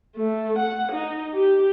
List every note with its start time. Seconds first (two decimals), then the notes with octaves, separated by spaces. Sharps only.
0.16 A3
0.59 F#5
0.92 D#4
1.34 G4